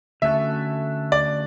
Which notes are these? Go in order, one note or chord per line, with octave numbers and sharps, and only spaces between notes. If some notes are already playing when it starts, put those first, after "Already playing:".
D3 A3 C#4 F#4 A4 E5
D5